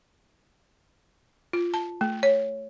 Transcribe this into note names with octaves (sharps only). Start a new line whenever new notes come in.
F4
A5
A3
C#5